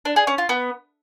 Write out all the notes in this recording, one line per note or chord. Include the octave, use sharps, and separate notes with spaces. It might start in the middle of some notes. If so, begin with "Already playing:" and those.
D4
G#4
C#4
F4
B3